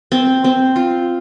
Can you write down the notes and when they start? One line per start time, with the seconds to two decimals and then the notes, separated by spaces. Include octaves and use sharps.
0.12 C4
0.44 C4
0.76 F4